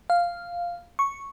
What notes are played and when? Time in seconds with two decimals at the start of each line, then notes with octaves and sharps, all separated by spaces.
0.10 F5
0.99 C#6